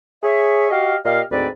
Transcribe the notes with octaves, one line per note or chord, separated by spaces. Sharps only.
G#4 C#5 E5
F#4 G4 D#5 F5
A#2 G4 D#5 F5
D2 G#2 C4 B4 D5